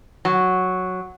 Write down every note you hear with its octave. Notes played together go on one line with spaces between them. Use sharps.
F#3